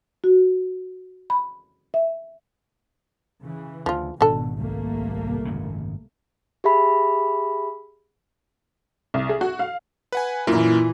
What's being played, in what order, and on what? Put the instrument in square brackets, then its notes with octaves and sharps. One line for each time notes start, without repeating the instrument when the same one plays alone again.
[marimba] F#4
B5
E5
[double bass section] C#3 E3
[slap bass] D2 [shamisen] F3 F4
[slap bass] G#1 [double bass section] B2 [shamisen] D4 A4
[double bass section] C2 A3 A#3
[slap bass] G#1 F#2 C#3
[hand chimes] G4 G#4 E5 B5
[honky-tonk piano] C2
G#4
F#4
F5
[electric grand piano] B4 F#5 G#5
[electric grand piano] F#2 A#3 [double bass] A#2 E3 [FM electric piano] E4 F4